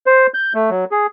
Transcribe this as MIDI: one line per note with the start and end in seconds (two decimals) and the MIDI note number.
0.06 0.27 72
0.34 0.53 91
0.54 0.70 57
0.70 0.85 54
0.91 1.07 68